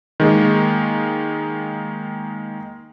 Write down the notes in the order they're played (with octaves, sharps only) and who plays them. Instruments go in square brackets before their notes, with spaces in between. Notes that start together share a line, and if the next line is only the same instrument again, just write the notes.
[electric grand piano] D#3 G#3 A#3